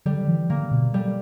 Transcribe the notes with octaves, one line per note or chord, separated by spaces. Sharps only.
D3 G3
E3
D3 A#3
B2
G3